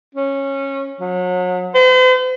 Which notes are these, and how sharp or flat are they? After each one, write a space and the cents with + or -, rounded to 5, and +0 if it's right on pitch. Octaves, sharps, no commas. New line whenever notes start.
C#4 -15
F#3 -35
C5 -45